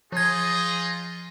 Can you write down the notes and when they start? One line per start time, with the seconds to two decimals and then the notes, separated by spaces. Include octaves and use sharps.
0.12 F3 D#4 F4 G#4 D#5 G#6